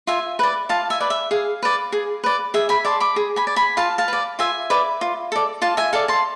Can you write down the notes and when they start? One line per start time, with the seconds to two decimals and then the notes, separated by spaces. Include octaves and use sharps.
0.07 F4 E5 G#5
0.39 B4 D5
0.69 F4 F5 A5
0.90 E5 G#5
1.00 B4 D5
1.10 E5
1.31 G#4 F5
1.63 B4 D5
1.92 G#4
2.24 B4 D5
2.54 G#4 E5
2.69 G#5 B5
2.85 D5 A5 C6
3.00 B5 D6
3.16 G#4
3.36 G#5 B5
3.47 D5
3.56 G#5 B5
3.77 F4 F5 A5
3.98 F5 A5
4.08 B4 D5
4.39 F4 E5 G#5
4.70 B4 D5
5.01 F4
5.32 A4 D5
5.62 F4 F5 A5
5.77 E5 G#5
5.93 A4 D5 F5 A5
6.08 A5 C6